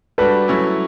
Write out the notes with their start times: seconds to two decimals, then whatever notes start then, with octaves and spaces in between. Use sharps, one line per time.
0.18 G3 D4 F#4 A4 B4
0.48 F#3 A3 C#4 E4